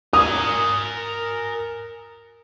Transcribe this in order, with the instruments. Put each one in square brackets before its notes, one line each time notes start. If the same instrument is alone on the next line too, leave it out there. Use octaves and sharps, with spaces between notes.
[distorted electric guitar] A#4 G#5 [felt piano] D#6